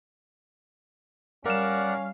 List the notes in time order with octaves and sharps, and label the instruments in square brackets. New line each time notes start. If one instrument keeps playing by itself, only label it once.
[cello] G3 F5 [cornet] C#4 [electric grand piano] A#4 F6 E7 [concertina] D5 F#5